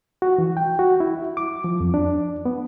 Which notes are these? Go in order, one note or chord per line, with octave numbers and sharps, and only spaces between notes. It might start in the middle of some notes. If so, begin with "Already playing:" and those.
F#4
E3
G5
F#4
E4
D6
F3
F2
D4
B3